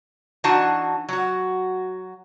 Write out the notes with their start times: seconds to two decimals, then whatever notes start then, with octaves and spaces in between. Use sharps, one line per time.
0.44 E3 D4 D#4 F#4 F#5 A5
1.09 F#3 F#4